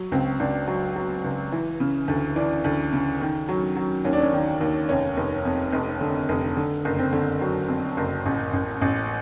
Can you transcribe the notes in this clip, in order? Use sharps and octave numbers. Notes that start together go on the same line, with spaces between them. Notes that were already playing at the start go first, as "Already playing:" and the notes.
Already playing: F#3
C#2 C4
C#2 D4
F#3
F#3
C#2
E3
C#3
D2
E3 D4
D2
C#3
D#3
F#3
F#3
D#2 C#4
D4
C#4
D#3
D#2
F1 C#4
F1
F2
F1
D3
F1
D3
F#1
C4
D3
F#3
F2
F#1
A1
A1
A1